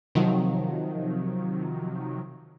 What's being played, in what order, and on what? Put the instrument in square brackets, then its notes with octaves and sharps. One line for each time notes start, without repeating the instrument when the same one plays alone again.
[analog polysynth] C3 D#3 F3 F#3